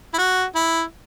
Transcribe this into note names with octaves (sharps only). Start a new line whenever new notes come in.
E4
F#4
E4